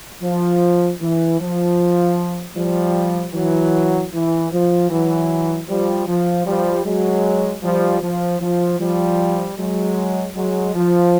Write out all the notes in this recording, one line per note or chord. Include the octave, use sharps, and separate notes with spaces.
F3
E3
F3
F3 G3
E3 F#3
E3
F3
E3 F#3
F3 G3
F3
F3 G3
F#3 G#3
F3 G3
F3
F3
F3 G3
F#3 G#3
F#3 G#3
F3